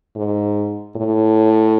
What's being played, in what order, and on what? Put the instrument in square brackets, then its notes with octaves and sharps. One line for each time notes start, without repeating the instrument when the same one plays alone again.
[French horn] G#2
A2